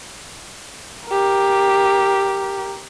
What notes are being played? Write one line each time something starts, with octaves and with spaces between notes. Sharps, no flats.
G4 A#4